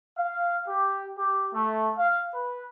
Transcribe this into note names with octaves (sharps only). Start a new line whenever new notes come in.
F5
G4
G4
A3
F5
B4